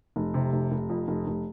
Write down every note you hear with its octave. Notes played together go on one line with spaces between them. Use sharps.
F1
C3
F1
F1
F2
F1
F1